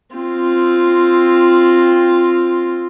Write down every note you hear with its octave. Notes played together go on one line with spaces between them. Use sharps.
C4 F4